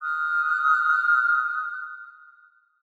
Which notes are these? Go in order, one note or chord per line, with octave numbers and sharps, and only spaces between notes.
D#6 F6 F#6